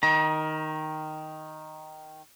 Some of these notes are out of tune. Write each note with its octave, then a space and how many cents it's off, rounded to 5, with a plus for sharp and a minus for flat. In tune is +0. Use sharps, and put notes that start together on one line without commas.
D#3 +0 A#5 +30